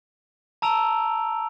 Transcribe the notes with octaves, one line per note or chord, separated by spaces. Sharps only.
A5 A#5 E6 D7 F7